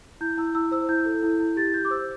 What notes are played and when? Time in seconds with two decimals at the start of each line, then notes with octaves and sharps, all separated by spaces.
0.21 E4 G6
0.38 E4 E6
0.55 E4 E6
0.71 C5 E6
0.89 E4 G6
1.06 A4
1.23 E4
1.40 E4
1.56 G4 A6
1.74 G4 G6
1.85 D6
1.90 C5 E6